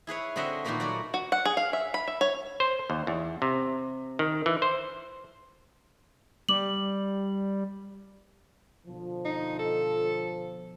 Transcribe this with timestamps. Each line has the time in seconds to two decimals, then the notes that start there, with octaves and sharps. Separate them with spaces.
0.07 E4 G#4 B4 C#5
0.36 D3 C4 F#4 D#5 E5 F#5
0.64 A#2 D#3 A3 A#3 F#4 B4
0.80 F#3 F#4 D5
1.14 F#4
1.32 F#5
1.45 G#4
1.57 F5
1.73 E5
1.94 B5
2.08 E5
2.21 C#5
2.60 C5
2.90 D#2
3.07 E2
3.42 C3
4.19 D#3
4.46 E3
4.62 C5
6.49 G3 D6 F#7
8.86 B2 D3 F3
9.25 D#4
9.59 A4